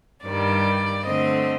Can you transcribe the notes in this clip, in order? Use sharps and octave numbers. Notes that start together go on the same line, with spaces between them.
G2 D#3 G3 D5
D3 A3 C4 D#5